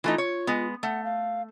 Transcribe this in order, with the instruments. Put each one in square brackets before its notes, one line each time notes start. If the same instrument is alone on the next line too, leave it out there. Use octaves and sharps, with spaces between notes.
[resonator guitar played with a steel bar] E3 A3 D#4 [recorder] F4
[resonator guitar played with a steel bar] C#5
G#3 B3
[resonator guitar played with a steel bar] A3 [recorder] F#5
[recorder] F5